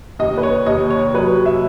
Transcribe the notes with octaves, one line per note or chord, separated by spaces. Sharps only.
D#2 D#5
B4
C#5
D#2 D#5
C#5
F#3 B4
E5